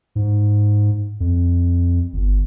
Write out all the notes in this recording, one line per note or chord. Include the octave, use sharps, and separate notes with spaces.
G#2
F2
G1